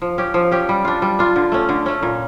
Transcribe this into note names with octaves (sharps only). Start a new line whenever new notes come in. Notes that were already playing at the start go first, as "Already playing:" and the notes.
F3
C#4 G4
F3
C#4 G4
G3
D4 F4
G3
D4 F4
D3
A3 C#4
D3
A3 C#4
A#2